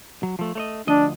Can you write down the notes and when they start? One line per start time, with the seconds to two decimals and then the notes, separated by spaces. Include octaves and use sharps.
0.23 F#3
0.39 F3 A3
0.55 A3 C#5 D#5
0.87 D2 F3 D4 D#5